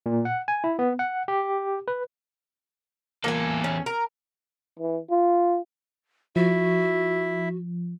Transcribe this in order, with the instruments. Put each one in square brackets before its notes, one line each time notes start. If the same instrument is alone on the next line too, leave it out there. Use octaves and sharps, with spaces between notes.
[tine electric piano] A#2
F#5
G#5
E4
B3
F#5
G4
B4
[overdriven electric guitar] E2 A4 [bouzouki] A#3 G#5
[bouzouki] C#4
A#4
[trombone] E3
F4
[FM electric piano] F3 [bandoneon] E4 E5 [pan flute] F#4